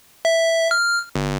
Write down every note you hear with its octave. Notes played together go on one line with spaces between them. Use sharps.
E5
F6
G1